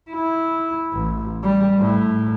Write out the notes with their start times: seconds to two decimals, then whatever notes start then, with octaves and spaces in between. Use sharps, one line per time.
0.11 E4
0.93 A1
1.43 G3
1.79 A2